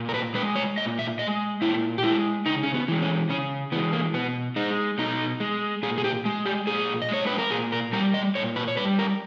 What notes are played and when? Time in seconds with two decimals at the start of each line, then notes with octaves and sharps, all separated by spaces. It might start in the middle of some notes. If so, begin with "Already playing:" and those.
Already playing: A#2
0.09 A#4
0.14 B4
0.34 G#3 B4
0.56 C#5
0.77 A#2 D#5
0.99 E5
1.19 G#3 D#5
1.61 A#2 E4
1.98 G4
2.03 G#3 E4
2.46 C#3 D#4
2.63 C#4
2.74 B3
2.88 E3 G#3
3.02 C#4
3.29 C#3 C#4
3.72 E3 B3
3.76 G#3
3.93 A#3
4.14 B2 B3
4.56 G#3 D#4
4.98 B2 D#4
5.40 G#3
5.83 A#2 G#4
5.98 G#4
6.04 G4
6.25 G#3
6.46 G4
6.67 A#2 G#4
7.02 D#5
7.09 G#3 C#5
7.27 B4
7.38 A#4
7.51 A#2 G#4
7.72 A#4
7.93 G3 A#4
8.14 D#5
8.35 A#2 C#5
8.56 B4
8.68 C#5
8.77 G3 B4
8.99 A#4